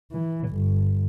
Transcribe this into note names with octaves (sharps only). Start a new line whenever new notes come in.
E3
G1